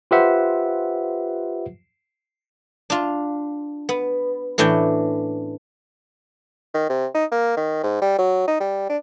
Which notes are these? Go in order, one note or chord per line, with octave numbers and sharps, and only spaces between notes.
F4 G4 B4 C5 E5 F#5
D4 F4
B3
A2 E3 C#4 D4 G5
D#3
C3
D#4
A#3
D#3
G#2
G3
F#3
D#4
G3
D4